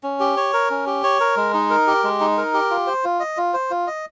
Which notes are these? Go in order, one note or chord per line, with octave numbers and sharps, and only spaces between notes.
C#4
G4
C#5
A#4
C#4
G4
C#5
A#4
G#3
D#4
A#4
G4
G#3
D#4
A#4
G4
F4
C5
F4
D#5
F4
C5
F4
D#5